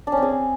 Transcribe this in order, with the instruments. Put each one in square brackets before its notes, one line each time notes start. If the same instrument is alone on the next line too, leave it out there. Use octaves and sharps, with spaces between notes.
[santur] D4
C#4
C4
G#4